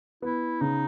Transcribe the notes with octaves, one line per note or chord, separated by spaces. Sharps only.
B3 E4
C#3 D#4